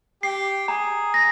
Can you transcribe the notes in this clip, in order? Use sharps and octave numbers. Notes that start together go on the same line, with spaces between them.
G4 C7
G#4 A#5
A#6